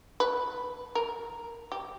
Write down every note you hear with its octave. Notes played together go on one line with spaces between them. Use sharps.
B4
A#4
G4